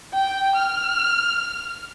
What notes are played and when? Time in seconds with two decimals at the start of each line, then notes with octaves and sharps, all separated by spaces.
0.14 G5
0.55 F6